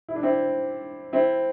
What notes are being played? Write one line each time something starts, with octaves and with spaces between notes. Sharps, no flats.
E4
D4
C4 E4
C4 E4